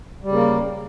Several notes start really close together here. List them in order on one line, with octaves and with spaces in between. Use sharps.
G3 C#3 A#3